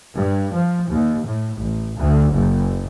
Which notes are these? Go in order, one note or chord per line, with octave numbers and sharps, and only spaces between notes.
G2
F3
D#2
A2
A1
D2
F#1